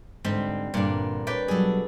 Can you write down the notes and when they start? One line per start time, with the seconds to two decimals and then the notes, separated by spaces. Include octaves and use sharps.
0.25 G#2 D3 G3 C4
0.74 G2 A#2 D3 D4 D5
1.27 B4 C#5 D5 E5 G5
1.48 B2 F#3 G3 G#4 A4